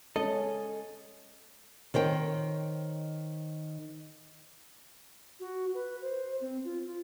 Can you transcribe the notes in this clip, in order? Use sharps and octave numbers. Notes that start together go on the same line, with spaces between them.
G#3 C#4 A4 D#5
D#3 C5 C#5 G5
F#4
B4
C5
C4
F4
F4